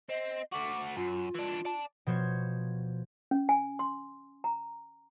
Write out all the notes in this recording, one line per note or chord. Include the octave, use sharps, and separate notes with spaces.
C4 D#5
A3 F#4 D6
F#2 F4
E3 D4
D5 A5
B2 F3 C5 C#5 G#6
C#4
G#5
C6
A#5